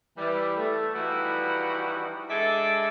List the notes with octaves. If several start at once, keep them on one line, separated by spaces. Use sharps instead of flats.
E3 G3
A3
E3 F3 G3 D#4 E4 F#4
G#3 D4 G#4 A4 D5 E5